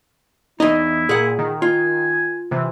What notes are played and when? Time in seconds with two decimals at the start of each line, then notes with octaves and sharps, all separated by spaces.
0.60 E2 D#4 E4 D#5
1.09 A#2 G#4 F#5
1.39 D#3
1.62 F4 G#5
2.51 C3 E3